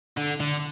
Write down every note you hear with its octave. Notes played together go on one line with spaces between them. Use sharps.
D3
D3